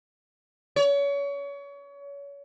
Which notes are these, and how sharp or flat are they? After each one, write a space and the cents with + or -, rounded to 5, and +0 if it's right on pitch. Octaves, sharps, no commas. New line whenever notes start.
C#5 +30